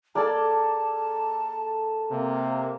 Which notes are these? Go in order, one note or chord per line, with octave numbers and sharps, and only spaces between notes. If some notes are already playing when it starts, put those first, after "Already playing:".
A#3 G#4 A4 D5 A5
C3 A#3